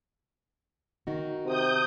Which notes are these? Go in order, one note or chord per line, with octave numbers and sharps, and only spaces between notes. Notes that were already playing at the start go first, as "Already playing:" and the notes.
D#3 D#4 F#4
C3 D#6 G6